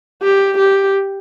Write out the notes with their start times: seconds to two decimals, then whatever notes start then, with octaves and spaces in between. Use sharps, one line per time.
0.23 G4
0.58 G4